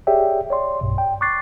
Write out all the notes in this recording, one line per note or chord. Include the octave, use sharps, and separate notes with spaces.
G4 G#4 C#5 D5 E5 G5
C#5 D5 C6
B1 G2 B2
G5
C#6 D6 F#6 A6 C7